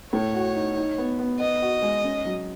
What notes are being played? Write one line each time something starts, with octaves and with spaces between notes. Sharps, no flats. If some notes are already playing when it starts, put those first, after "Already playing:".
A2 C#5
F#4
D#4
D#4
B3
B3
B3 D#5
F#4
G#3
C#4
F#3